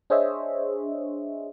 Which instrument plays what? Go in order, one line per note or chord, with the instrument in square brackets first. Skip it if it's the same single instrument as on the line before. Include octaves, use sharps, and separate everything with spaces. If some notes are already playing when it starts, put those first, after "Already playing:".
[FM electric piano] D4 G#4 C5 C#5 D#5 E5